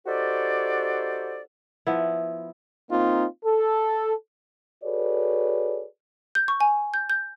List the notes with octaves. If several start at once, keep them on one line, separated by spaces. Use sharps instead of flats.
D#4 F#4 G4 A4 C5 D5
F3 B3 E4
A#3 C4 D#4 F4
A4
F#4 G#4 A4 B4 C#5 D5
G6
C#6
G#5
G6
G6